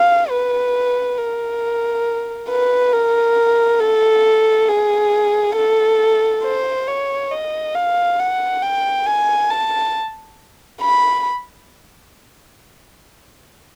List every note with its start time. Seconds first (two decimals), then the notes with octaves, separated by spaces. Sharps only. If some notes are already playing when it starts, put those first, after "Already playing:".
Already playing: F5
0.30 B4
1.18 A#4
2.49 B4
2.93 A#4
3.81 A4
4.68 G#4
5.56 A4
6.43 C5
6.88 C#5
7.32 D#5
7.74 F5
8.19 F#5
8.62 G5
9.06 G#5
9.50 A5
10.81 B5